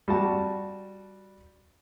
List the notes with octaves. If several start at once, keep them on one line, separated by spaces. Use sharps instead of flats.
G3 F#4 A5